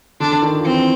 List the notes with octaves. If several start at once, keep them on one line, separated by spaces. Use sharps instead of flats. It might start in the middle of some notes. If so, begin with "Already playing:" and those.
D3 D4
D3
D#3
F3
E3 C4